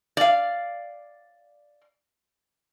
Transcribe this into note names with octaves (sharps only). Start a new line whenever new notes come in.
D5 F5